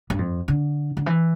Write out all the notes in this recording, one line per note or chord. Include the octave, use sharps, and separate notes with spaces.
G2
F2
D3
D3
E3